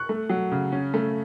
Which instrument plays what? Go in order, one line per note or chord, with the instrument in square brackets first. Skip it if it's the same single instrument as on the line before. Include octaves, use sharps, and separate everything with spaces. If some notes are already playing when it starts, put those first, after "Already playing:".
Already playing: [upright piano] C#6 F#6
A3
F#3
C#3
C#4
A3